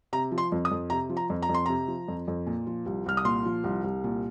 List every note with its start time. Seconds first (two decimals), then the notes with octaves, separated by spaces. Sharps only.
0.13 C3 A#5
0.31 F3
0.38 C6
0.52 F2
0.65 D#6
0.71 F2
0.90 C3 A#5
1.09 F3
1.17 A#5
1.30 F2
1.42 A#5
1.49 F2
1.54 C6
1.66 C3 A#5
1.88 F3
2.08 F2
2.28 F2
2.47 A#2
2.67 F3
2.86 C2
3.06 C2 F6
3.17 D#6
3.25 A#2 C6
3.45 F3
3.64 C2
3.84 C2
4.04 A#2